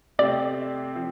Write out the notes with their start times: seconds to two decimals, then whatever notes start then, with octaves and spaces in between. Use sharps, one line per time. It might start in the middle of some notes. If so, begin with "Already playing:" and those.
0.19 C3 A3 C4 D5
0.95 F3 C4